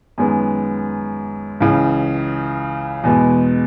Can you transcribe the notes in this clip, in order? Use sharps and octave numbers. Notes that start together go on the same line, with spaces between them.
F#2 D#3 G#3 B3
C#2 C#3 E3
E2 B2 G#3 B3